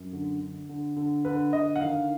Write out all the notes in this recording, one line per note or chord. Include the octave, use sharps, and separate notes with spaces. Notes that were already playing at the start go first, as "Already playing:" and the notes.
Already playing: F#2
D3
D3
D3
D3
D3 B4
D3 D#5
F#5
D#3 F5